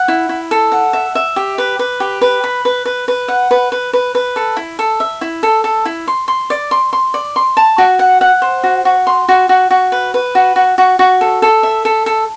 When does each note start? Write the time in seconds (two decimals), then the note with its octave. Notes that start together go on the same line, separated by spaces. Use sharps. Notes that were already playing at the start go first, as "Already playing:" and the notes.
Already playing: F#5
0.08 E4
0.29 E4
0.51 A4
0.72 F#5
0.93 E5
1.15 E5
1.36 G4
1.58 B4
1.79 B4
2.00 G4
2.21 B4
2.44 B5
2.65 B4
2.85 B4
3.08 B4
3.28 F#5
3.51 B4
3.72 B4
3.93 B4
4.15 B4
4.36 A4
4.57 E4
4.79 A4
5.00 E5
5.21 E4
5.43 A4
5.64 A4
5.85 E4
6.08 C6
6.28 C6
6.50 D5
6.71 C6
6.93 C6
7.14 D5
7.36 C6
7.57 A5
7.78 F#4
7.99 F#5
8.21 F#5
8.42 C5
8.63 F#4
8.85 F#4
9.07 C6
9.29 F#4
9.49 F#4
9.71 F#4
9.92 B4
10.14 B4
10.35 F#4
10.56 F#4
10.78 F#4
10.99 F#4
11.21 A4
11.42 A4
11.63 E5
11.85 A4
12.06 A4